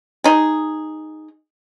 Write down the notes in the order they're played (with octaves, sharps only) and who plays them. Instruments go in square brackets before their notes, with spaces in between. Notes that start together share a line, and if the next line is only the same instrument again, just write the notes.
[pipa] D#4 G#4